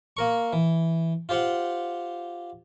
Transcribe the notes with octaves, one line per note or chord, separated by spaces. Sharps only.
A#3 A#4 C#6
E3
F4 G4 C5 F5 F#5